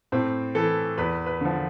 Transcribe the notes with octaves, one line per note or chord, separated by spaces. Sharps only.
A2 C4
E3 A4
E2 B4
B4
D3 F3